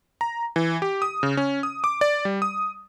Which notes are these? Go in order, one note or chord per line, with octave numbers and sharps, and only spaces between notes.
A#5
E3
G4
D#6
C#3
C#4
D#6
D6
D5
G3
D#6